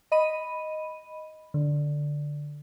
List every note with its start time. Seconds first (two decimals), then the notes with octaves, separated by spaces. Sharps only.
0.12 D#5 B5 D#7
1.54 D3